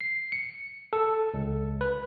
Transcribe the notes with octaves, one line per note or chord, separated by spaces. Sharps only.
C7
C#7
A4
C#2
B4